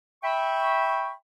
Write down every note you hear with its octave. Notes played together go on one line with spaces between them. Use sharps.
E5 G5 B5 C#6